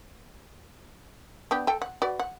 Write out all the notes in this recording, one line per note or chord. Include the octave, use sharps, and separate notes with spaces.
B3 D4 G4
A4 G5
F#5
F#4 B4 D5
F#5